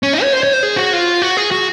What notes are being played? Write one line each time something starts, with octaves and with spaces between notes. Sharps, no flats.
C#4
D#4
C#5
C5
C#5
C5
G#4
F#4
F4
F#4
G#4
F#4